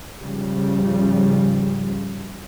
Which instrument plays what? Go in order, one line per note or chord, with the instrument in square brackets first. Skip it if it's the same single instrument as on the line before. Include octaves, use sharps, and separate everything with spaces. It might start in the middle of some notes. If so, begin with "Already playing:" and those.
[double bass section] G#2 C#3 F3 G3